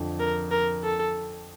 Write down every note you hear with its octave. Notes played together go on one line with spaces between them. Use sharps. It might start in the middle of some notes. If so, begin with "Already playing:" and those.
Already playing: F2 D3 F3
A#4
A#4
A4